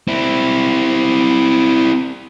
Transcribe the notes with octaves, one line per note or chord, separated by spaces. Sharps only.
C4 E4